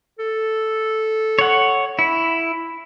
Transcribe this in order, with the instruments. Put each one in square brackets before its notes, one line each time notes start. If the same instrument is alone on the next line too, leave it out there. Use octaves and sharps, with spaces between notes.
[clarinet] A4
[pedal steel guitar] C#5 F#5
E4